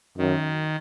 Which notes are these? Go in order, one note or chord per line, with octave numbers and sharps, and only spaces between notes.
F#2 D#3